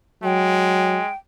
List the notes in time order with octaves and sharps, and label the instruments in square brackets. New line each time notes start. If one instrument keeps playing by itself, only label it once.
[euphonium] F#3 [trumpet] G#3 [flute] G5